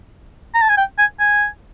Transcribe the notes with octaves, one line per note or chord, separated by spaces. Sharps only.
A#5
A5
G#5
G5
G#5
G#5